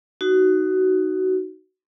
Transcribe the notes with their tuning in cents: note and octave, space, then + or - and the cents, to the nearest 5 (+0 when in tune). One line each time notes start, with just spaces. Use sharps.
D#4 +0 F#4 +15